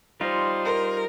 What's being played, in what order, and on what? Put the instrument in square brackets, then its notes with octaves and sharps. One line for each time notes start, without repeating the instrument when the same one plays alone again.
[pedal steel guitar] G3 D#4 F4 [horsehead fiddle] C5
[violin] A#4